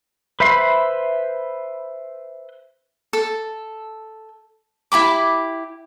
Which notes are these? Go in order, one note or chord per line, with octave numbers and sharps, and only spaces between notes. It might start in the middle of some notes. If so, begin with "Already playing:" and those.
B4 C5 E5 B5 C6
A4
E4 G4 B5 D6